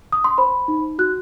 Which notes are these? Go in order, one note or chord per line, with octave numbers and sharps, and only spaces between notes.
D#6
C6
C5 B5
D#4
F#4 F#6